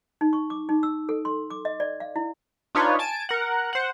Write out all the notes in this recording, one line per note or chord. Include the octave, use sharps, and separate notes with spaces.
D#4
C#6
D6
D#4
E6
A4
C6
D6
D#5
D5
F5
E4
D4 D#4 F4 B4 C#5
G#5 A5 D7
A#4 F#5
C5 F#5